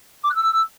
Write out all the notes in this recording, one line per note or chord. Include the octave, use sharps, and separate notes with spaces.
D6
F#6
E6